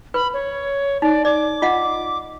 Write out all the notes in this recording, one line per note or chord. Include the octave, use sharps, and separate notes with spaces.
B4 B5
C#5
D#4 D5
D5 D6
F4 D#5 F#5